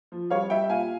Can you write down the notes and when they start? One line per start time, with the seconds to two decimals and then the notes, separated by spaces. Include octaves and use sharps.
0.12 F3
0.30 G3 C#5 F5
0.50 G3 E5 G5
0.69 A#2 F5 G#5